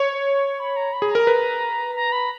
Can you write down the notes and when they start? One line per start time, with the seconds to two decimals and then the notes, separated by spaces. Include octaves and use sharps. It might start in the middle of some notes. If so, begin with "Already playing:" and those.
Already playing: C#5 C#6
0.60 B5
0.76 A#5
0.93 B5
1.02 G#4
1.10 A#4 A#5
1.27 B4
1.95 A#5
2.12 B5